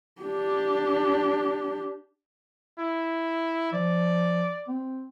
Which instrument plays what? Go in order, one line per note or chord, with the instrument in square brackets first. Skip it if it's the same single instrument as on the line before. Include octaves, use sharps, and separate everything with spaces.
[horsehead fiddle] D4 G4
[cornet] E4
[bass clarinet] F3 [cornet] D5
[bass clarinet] C4